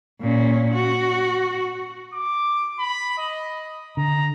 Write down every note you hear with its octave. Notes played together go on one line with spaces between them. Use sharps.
A#2 C#4
F#4
D6
B5
D#5
D3 A#5